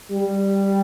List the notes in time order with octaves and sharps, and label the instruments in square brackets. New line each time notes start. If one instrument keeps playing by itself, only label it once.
[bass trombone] G3